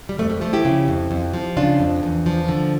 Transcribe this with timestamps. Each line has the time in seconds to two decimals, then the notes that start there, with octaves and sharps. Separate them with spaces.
0.09 G3
0.18 F2 A3
0.30 G3
0.41 F3 A3
0.53 E4 G4
0.65 C#3
0.88 F2
1.11 F2
1.34 F3
1.57 C#3 D4 F4
1.80 F2
2.03 E2
2.26 F3
2.48 D3